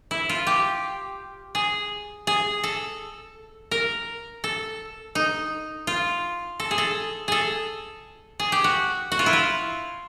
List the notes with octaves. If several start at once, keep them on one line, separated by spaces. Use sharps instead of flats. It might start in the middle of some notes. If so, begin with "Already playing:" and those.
E4
F4
G4
G#4
G#4
A4
A#4
A4
D#4
F4
A4
G#4
A4
G#4 A4
G#4
G4
F#4
F#4
F4
E4
F4